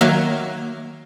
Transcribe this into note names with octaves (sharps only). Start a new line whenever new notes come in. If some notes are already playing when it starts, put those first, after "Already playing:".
D#3 F#3 A#3 E5 F6 A#6